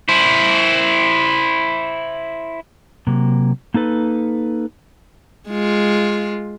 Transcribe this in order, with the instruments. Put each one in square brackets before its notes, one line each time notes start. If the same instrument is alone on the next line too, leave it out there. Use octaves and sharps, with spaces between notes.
[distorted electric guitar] E4 C5
[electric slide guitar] C3 F#3 A#3
A#3 D#4 A4 B4
[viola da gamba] G#3 F4